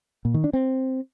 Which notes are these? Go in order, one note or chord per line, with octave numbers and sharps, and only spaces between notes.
A#2
D#3
D4
C4